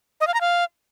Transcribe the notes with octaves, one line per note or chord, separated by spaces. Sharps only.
D#5
F5
A#5
F5